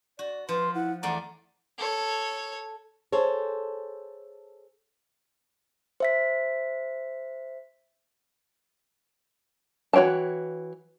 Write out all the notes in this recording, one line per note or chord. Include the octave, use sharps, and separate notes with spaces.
F#4 D5
F3 B4 C6
E4 F#5
E2 A3 D5 F#5 A#5
A4 C#5
G#4 A4 C5 C#5
C5 E5 B6
E3 F#4 C#5 G5 A5